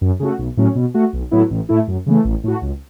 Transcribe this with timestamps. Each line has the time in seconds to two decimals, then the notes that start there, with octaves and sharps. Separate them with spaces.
0.01 F#2
0.20 C#3 A3 F#4
0.38 B1
0.57 A2 F#3 C#4
0.75 B2
0.94 A3 F#4
1.13 B1
1.31 A2 F#3 B3 E4
1.50 A1
1.69 A2 A3 E4
1.88 F#2
2.06 C#3 E3 A3
2.25 A1
2.44 A2 A3 F#4
2.62 C#2